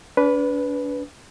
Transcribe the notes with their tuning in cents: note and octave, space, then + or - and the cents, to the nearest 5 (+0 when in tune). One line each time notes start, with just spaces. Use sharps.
D4 -35 B4 +0